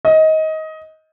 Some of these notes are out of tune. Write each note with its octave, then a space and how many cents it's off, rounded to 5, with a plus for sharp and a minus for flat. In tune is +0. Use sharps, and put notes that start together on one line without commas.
D#5 +20